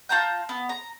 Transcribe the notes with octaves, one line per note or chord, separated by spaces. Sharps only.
F4 A5 A#5 G6
B3
A#5